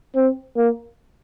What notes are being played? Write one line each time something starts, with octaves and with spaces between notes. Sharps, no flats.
C4
A#3